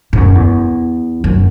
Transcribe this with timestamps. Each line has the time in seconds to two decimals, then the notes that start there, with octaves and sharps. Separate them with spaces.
0.13 G#2
0.17 F#2
0.35 E2
1.24 F#2